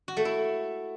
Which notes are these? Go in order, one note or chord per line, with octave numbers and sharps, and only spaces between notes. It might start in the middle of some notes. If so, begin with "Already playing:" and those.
F#4
A3
E4